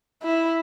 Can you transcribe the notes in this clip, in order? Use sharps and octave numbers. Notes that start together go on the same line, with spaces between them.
E4